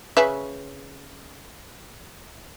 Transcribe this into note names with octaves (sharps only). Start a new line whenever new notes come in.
C#3 B4 E5